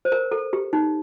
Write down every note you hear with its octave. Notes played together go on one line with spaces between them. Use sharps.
C5
A#4
A4
G4
D#4